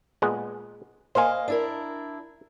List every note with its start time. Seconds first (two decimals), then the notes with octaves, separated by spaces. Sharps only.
0.22 A#2 G#3 B3
1.15 A#3 C5 D#5 F5 G#5
1.48 D4 E4 A#4